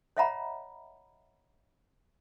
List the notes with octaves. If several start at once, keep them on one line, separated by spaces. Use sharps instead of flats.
C#5 D#5 E5 F#5 A#5 B5